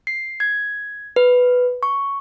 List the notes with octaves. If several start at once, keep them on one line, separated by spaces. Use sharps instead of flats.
C7
G#6
B4
C#6